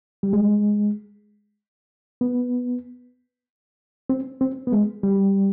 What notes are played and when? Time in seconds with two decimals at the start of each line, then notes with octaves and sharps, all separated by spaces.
0.23 G3
0.33 G#3
2.21 B3
4.10 C4
4.41 C4
4.67 B3
4.72 G#3
5.03 G3